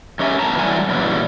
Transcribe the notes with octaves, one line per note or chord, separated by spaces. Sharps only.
F#2 C#4 G4 A#4 E5 G#5
E2 B2 A5 A#5
D3 E3 F#3 G3 A3 G#5
F#2 A#2 D3 E3 F#3 G3